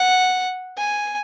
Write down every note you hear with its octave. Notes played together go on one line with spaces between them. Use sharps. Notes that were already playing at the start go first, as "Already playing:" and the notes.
Already playing: F#5
G#5